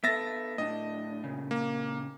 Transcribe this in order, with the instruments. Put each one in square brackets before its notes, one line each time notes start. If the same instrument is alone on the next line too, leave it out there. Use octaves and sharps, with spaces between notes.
[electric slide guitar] B3 A4 [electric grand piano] E5 A6 A#6
[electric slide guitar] A2 D4 [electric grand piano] D#5
[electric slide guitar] A#2 C#3
[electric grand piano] A#3